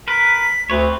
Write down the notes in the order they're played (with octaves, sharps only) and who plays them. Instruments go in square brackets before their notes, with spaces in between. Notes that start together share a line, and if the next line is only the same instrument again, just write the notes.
[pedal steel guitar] A#4 B4 [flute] B6
[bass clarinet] D2 [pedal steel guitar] C4 B4 C#5